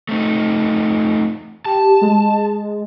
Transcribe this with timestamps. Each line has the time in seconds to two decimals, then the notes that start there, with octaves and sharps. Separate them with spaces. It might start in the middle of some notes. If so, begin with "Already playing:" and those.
0.09 A3 C4 D#4
1.65 G4 A5
2.01 G#3